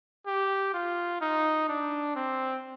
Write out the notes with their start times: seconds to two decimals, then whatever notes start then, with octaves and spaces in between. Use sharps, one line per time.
0.27 G4
0.74 F4
1.21 D#4
1.69 D4
2.16 C4